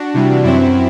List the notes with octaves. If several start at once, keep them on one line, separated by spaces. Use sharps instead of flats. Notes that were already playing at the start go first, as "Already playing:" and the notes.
Already playing: D4 F#4
C3 E3 G3
F#2 F#3 C4 E4